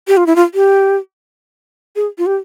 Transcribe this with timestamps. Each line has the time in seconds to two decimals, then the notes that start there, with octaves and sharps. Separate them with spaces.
0.08 G4
0.17 F4
0.26 E4
0.36 F4
0.54 G4
1.96 G#4
2.18 F4
2.26 G4